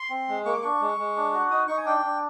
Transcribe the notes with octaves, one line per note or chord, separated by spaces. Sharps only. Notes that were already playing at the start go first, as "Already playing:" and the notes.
Already playing: C6
C4
G#3
A#3 C#6
D6
D4 C#6
G#3
G#3
D4
F#4
D#4 D#6
D#4 C#6
G#5
D4 G5
D4